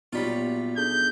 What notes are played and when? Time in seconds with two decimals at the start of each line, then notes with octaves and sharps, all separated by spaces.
0.13 A#2 F#3 G3 B3 D#4 F4 F#4 B6
0.77 D4 G#4 A4 G6